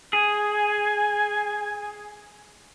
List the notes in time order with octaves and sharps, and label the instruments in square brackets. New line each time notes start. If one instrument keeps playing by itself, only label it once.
[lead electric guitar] G#4 [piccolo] G#5